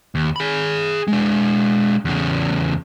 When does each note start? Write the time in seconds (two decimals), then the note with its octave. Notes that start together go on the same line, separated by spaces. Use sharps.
0.15 D#2
0.36 G#4 B5
1.08 G#3 D4
2.05 E2 C#3